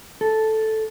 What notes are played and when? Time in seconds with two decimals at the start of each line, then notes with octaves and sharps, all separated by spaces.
0.21 A4